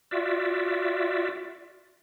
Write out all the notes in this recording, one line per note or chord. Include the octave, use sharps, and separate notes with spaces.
F4 F#4 D5 E5